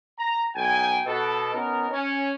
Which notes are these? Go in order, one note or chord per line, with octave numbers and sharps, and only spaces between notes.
A#5
B1 G5 G#5
B2 A4
B3 C#4 D#4 A#4
C#4